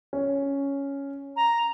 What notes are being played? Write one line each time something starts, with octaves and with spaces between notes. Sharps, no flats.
C#4
A#5